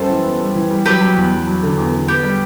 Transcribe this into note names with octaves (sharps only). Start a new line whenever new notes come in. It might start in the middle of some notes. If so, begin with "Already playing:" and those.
Already playing: F#2 G3 B3 A4 C5
E3
B3
G3
E3
G3
F#3 G4 B4
F#3
E2
F#3
F#3
D3
E2
D3
B3 G4
G3